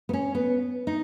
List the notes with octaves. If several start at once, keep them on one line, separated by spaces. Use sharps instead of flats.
B3
C#4
B3
D#4